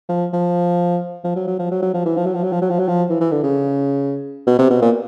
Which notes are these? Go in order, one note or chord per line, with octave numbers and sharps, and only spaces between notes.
F3
F3
F3
F#3
F#3
F3
F#3
F#3
F3
E3
F3
F#3
F3
F#3
F3
F#3
F3
F#3
F3
E3
E3
D3
C#3
B2
C3
B2
A#2